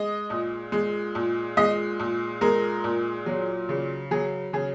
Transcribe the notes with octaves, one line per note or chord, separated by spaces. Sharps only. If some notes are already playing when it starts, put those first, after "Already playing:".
Already playing: G#3 D#5
A#2
G#3
A#2
G#3 D#5
A#2
G#3 A#4
A#2
F#3
C#3
F#3 G#4
C#3 G#4